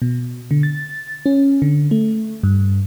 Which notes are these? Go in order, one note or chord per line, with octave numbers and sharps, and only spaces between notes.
B2
D3
A6
C#4
D3
A3
G2